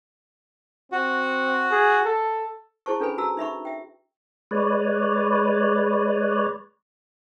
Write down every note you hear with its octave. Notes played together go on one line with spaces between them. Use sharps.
C4 F#4
G#4
A4
E4 G#4 C5 A5 C#6
C#4 D4 A4 B4 G#5 B5
F#4 A5 A#5 E6
D#4 E5 B5 C#6
E5 G5
G#3 B4 C#5 D5